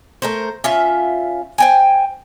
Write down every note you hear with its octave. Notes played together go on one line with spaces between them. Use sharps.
A3 A#4 C5
C#4 F4 E5
C5 G5 G#5